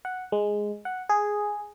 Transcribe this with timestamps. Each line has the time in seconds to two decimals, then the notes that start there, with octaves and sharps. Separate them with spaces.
0.05 F#5
0.32 G#3
0.85 F#5
1.09 G#4